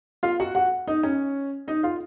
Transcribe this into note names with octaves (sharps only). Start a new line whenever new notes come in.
F4 F5
F#4 F#5
F#4 F#5
D#4 D#5
C#4 C#5
D#4 D#5
F4 F5